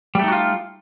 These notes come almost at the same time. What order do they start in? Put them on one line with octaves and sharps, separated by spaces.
G3 A3 D#4 F#4 F4